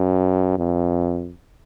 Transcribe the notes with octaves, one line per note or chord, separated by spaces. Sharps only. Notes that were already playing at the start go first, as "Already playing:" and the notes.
Already playing: F#2
F2